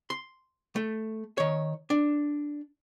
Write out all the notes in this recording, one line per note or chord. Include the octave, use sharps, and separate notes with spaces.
C6
A3
D#3 C#5
D4